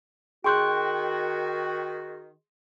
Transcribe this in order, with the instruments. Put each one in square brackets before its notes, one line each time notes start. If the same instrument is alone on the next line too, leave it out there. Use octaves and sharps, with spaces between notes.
[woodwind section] D#3 F#4 [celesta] G#4 C6 G6 [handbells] G5 C#6 F#6